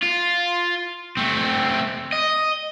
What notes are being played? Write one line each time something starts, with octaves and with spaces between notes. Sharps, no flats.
F4
A3 C4
D#5